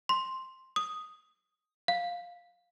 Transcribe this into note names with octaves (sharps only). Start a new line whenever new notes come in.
C6
D#6
F5